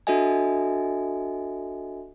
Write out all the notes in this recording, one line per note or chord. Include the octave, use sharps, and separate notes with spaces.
D4 F#4 A4 D#5 E5 G#5